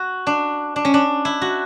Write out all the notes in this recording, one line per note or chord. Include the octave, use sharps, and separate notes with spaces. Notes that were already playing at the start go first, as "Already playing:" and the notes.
Already playing: F#4
D4
D4
C#4
D4
E4
F#4